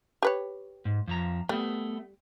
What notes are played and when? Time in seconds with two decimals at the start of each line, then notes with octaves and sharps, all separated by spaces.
0.22 G4 B4 C#5
0.85 G#2
1.07 F2 F3 A#5
1.49 G3 A3 B3